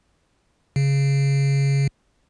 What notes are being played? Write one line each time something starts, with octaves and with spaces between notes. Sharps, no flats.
C#3